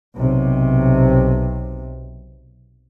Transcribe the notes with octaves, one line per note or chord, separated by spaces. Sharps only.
B1 C3